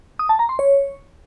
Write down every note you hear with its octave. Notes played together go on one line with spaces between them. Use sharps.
D#6
A5
A#5
C6
C#5